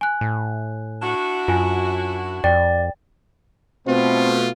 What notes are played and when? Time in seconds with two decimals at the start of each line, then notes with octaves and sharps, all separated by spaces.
0.01 G#5 F#6
0.21 A2
1.02 D4 E4 F#4
1.48 F#2 F4 G#5
2.44 F2 D5 G5
3.87 B2 A3 C4 F4